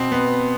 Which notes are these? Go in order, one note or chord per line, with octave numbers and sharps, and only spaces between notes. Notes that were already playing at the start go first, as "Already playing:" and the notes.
Already playing: B2 C4
B3